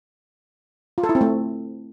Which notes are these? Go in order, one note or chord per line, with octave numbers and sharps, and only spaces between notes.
F4
A4
E4
C4
A3